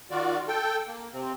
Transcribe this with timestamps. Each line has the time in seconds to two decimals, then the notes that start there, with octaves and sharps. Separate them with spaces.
0.11 D#3 F4 F#4 D5
0.48 A4 G5
0.87 A#3
1.13 C3 C4